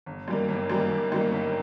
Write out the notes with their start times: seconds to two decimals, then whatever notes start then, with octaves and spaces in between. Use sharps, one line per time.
0.06 G1
0.28 F#2 D#3 G3 A#3
0.48 G1
0.70 F#2 D#3 G3 A#3
0.91 G1
1.12 F#2 D#3 G3 A#3
1.32 G1